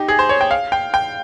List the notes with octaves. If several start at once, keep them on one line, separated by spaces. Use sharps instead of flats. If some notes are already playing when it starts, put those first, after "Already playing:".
Already playing: D#4 G4
G#4
C5
C#5
G5
F5
G5
G5